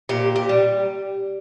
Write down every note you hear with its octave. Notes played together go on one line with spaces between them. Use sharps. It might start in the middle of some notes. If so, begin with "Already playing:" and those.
A#2 G4
G4
G3